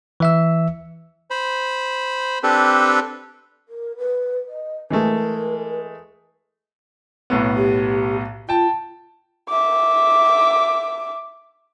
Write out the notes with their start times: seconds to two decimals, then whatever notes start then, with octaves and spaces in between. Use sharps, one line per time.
0.20 E3 E5 E6
1.30 C5 B5
2.43 C4 D4 G4 A4 B4
3.68 A#4
3.98 B4
4.48 D#5
4.91 E3 G#3 A3 A#4
7.30 B1 A2 B3
7.57 G4
8.49 F4 G5 A5
9.49 E5 D6